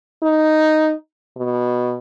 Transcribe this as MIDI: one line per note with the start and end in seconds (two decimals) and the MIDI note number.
0.23 0.93 63
1.37 1.98 47